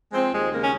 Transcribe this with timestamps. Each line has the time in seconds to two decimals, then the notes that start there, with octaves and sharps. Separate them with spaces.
0.12 F3 G#3 C4
0.31 D#2 G#3
0.51 C#3 A#3
0.61 C#4